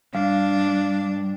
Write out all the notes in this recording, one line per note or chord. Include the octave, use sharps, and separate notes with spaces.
G2 D4 F5